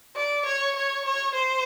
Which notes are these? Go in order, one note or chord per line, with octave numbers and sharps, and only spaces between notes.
D5
C#5
C#5
C#5
C5